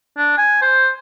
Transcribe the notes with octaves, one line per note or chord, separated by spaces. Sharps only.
D4
G#5
C5